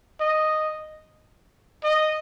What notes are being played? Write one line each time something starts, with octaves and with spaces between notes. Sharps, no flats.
D#5
D#5